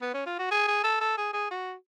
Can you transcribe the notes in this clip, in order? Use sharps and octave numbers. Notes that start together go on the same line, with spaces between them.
B3
C#4
F4
F#4
G#4
G#4
A4
A4
G#4
G#4
F#4